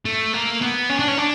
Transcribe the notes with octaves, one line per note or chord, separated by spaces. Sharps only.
A3
A#3
B3
C#4
D4
C#4
D4